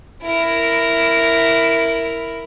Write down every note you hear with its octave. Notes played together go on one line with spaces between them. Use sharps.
E4 A#4